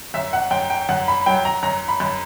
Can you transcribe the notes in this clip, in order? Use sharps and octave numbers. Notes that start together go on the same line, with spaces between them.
F#2 E5
F#5
F#2 G5
G5
F#2 F#5
B5
F#3 G5
A#5
F#2 A#5
B5
F#2